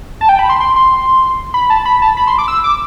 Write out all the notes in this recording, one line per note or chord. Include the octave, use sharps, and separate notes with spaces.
A5
G5
B5
C6
C6
C6
B5
A5
B5
A5
B5
C6
D6
E6
D6